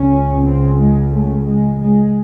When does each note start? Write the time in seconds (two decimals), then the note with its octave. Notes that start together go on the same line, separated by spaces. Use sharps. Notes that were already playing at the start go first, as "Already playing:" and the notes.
Already playing: C#2 C#3 C#4
0.46 C4
0.80 G#3
1.13 A3
1.47 G#3
1.79 G#3